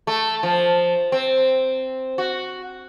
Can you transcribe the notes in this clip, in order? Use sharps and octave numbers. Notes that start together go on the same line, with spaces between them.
A3
F3
C4
F#4